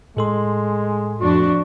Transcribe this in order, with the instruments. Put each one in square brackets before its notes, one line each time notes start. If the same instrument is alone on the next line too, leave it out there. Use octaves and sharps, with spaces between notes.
[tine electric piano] A2 A4 C6 [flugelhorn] G#3
[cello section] F2 A3 D4 [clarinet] F#4